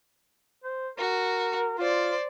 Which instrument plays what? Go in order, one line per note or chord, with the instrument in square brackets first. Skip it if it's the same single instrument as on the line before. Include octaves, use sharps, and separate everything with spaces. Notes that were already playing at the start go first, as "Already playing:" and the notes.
[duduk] C5
[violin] F#4 [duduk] A#4
[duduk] F4 [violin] C5 D5